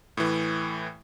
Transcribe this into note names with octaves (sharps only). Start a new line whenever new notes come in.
A2 E3